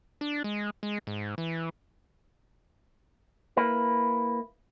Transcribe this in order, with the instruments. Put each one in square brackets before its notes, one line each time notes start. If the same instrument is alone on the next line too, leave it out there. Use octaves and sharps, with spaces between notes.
[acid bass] D4
G#3
G#3
G#2
E3
[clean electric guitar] A#3 E4 B4